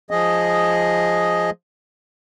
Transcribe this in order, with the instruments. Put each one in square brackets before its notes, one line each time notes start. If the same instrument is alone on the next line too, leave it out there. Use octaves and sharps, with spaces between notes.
[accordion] F3 G#4 D#5